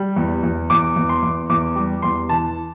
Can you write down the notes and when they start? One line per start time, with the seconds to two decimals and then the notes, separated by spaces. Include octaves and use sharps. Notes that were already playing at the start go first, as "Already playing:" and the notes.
Already playing: G3
0.16 E2
0.43 E2
0.70 E2 D6
0.96 E2
1.09 C6
1.23 E2
1.50 E2 D6
1.76 G3 D6
2.02 E2 C6
2.29 E3 A5